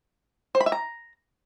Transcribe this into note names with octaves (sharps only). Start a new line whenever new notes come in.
C5
B5
E5
A#5